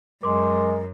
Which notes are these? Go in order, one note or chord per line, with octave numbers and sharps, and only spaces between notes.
F#2 G#3 A#4 C6 D6